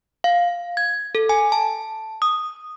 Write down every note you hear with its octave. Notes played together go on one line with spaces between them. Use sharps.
F5
G#6
A4
G#5
A5
D#6